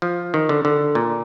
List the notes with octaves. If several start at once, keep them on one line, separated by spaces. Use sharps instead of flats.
F3
D#3
D3
D3
A#2